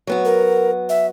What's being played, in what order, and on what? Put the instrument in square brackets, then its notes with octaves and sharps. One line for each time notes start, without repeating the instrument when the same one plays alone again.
[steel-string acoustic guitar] F#3 B3 F#4
[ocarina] A#4
E5